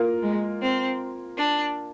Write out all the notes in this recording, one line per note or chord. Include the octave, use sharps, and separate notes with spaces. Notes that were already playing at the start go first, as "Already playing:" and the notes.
Already playing: A#3 F4 A#4
G#3
C4
D4